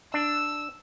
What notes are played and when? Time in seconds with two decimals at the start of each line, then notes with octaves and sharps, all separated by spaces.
0.14 D4 E6